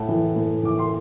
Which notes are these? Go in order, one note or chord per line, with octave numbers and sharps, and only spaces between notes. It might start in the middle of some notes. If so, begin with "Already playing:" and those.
Already playing: A2 F#5 A5
E3
A2
E3 D6
C6